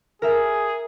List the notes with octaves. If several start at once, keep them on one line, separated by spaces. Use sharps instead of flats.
G#4 A#4 E5